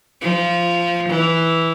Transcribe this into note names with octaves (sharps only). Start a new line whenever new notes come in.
F3
E3